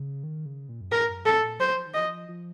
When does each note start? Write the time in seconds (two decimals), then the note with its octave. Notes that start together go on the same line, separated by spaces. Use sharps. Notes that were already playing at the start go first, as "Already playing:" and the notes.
Already playing: C#3
0.24 D#3
0.46 C#3
0.69 A#2
0.81 F#2
0.92 A2 A#4
1.09 F#2
1.25 A2 A4
1.43 A#2
1.59 F#3 C5
1.73 F3
1.87 D#3
1.94 D#5
1.99 F3
2.29 F3